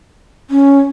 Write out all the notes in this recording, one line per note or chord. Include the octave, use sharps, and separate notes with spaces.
C#4